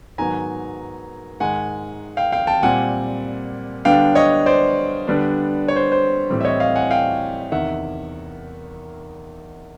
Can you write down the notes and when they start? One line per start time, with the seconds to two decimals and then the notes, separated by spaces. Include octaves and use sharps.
0.18 G#2 D#3 F#3 B3 G#5 A#5
1.40 G#2 D#3 G#3 F#5 G#5
2.17 F5 G5
2.32 F5 G5
2.47 G5 A5
2.62 A#2 G3 C4 F#5 G#5
3.85 D3 G3 B3 D4 F5 G5
4.15 C#5 D#5
4.46 C5 D5
5.07 D3 G3 B3 D4
5.68 C#5
5.76 C5
5.92 C5
6.30 A2 E3 G3 C4
6.41 E5
6.45 C#5 D#5
6.60 D#5 F5
6.75 F#5 G#5
6.91 F5 G5
7.52 E2 C3 D#3 E5 F#5